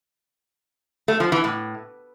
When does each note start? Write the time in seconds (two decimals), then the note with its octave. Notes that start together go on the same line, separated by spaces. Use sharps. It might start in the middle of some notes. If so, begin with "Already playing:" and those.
1.08 A3
1.20 F3
1.32 E3
1.44 A2